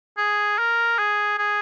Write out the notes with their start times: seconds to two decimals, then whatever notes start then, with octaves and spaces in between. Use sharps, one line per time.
0.18 G#4
0.58 A#4
0.98 G#4
1.38 G#4